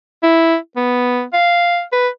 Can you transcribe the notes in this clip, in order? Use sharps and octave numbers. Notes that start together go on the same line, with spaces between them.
E4
B3
F5
B4